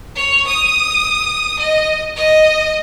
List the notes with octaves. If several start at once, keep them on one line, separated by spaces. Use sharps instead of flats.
C#5
D#6
D#5
D#5